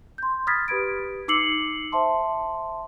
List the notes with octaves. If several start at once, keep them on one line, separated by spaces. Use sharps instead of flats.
C6 G6
B5 D#6 F6 G#6 A6 B6
G4 B4 D#6 G#6 D7
D#4 D6 E6 C7 C#7 F#7
C5 E5 A5 C6